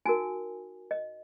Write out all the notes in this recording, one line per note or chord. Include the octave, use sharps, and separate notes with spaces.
D#4 F#4 A#4 G#5
D#5